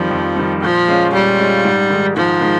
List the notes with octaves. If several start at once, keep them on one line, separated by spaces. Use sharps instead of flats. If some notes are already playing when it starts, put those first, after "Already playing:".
Already playing: F2 D#3 F3 G3
F2
D#3 G3
A#2 F3
G#3 C#4 F4
A#2 G3
G#3 C#4 F4
G#2
D#3 G#3
G#2 F3
D#3 G#3